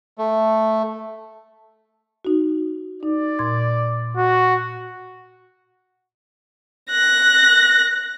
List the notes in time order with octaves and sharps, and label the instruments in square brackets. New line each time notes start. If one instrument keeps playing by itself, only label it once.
[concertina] A3
[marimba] D#4 F#4
[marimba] D#4 [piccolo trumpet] D5
[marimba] A#2 C6 G#6
[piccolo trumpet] F#4
[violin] F#6 A#6